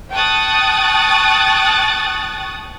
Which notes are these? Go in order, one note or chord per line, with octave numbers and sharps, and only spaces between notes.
G5 A5 C#6 D#6 F#6 A6